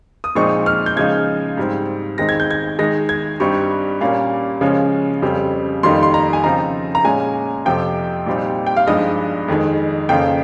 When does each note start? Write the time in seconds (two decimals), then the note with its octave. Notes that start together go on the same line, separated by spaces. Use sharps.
0.24 D#6
0.35 A#2 F3 G#3 C4 D#4 C#6
0.66 F6
0.86 G6
0.96 C#3 F3 G#3 D#4 G#6
1.57 G#2 G3 C4
2.18 D#3 G#3 C4 D#4 A#6
2.29 G#6
2.40 G6
2.51 G#6
2.79 D#3 G#3 D#4 A#6
3.09 G#6
3.40 G2 G3 C4 D#4 C#6
4.00 A#2 G3 A#3 C#4
4.61 C#3 F3 G#3 C#4
5.22 F2 C#3 G3 C4
5.83 F2 D#3 G3 A#3 D#4 C6
6.03 C6
6.14 A#5
6.33 G#5
6.44 C#3 F3 C4 D#4 A#5
6.95 A#5
7.04 A#2 G#3 C#4 G#5
7.65 F2 C3 F3 G5
8.26 A#2 G3 C4 D#4
8.66 G5
8.77 F5
8.87 G2 F3 G#3 D#4 D#5
9.48 F2 D#3 G#3
10.09 F2 C#3 F3 A#3 G5